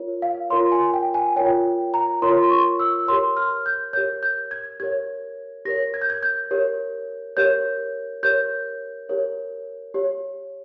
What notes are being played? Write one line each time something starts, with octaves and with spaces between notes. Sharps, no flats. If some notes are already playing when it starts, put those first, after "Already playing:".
Already playing: F4 A#4 C#5
F5
F4 A#4 C#5 C6
G#5
G5
G#5
F4 A#4 C#5 G5
A#5
F4 A#4 C#5 C6
C6
C#6
E6
G4 A#4 C#5 C6
F6
G6
G4 A#4 C#5 G6
G6
G#6
G4 A#4 C#5 G#6
G4 A#4 C#5 A#6
G#6
G6
G#6
G6
G4 A#4 C#5
G4 A#4 C#5 G6
G4 A#4 C#5 G6
G4 A#4 C#5
G4 C#5